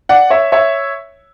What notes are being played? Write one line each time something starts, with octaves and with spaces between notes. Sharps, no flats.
D5 F#5
C#5 E5
C#5 E5